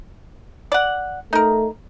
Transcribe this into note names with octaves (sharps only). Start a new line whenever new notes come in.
D5 F#5
A3 D#4 A#4